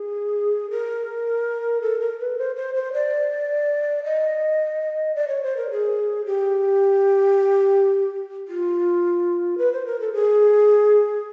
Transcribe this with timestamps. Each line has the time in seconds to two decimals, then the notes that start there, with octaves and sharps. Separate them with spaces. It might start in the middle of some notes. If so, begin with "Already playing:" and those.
Already playing: G#4
0.71 A#4
1.81 A4
2.00 A#4
2.20 B4
2.38 C5
2.56 C5
2.74 C5
2.93 D5
4.04 D#5
5.15 D5
5.28 C#5
5.43 C5
5.57 A#4
5.71 G#4
6.26 G4
8.48 F4
9.58 B4
9.73 C5
9.86 A#4
10.00 A4
10.13 G#4